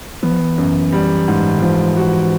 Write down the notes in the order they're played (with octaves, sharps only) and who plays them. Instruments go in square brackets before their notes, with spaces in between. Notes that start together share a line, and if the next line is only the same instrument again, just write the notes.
[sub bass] E3 [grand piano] B3
[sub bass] F3
E3
[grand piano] F#2
G3
G#2
[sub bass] D#3
[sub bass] E3 [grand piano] F3
[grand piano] F#4